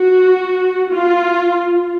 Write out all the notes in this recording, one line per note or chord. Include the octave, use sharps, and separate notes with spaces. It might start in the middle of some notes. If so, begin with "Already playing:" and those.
Already playing: F#4
F4